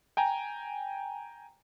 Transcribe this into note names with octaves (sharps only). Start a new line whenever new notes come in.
G5 G#5 A#5